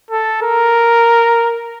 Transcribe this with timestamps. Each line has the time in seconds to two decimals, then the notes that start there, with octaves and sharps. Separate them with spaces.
0.11 A4
0.42 A#4